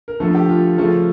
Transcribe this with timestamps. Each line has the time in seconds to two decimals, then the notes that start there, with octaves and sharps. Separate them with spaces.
0.08 A#4
0.20 D3 F3 A3 A4
0.35 G4
0.49 F4
0.78 C#3 F3 A3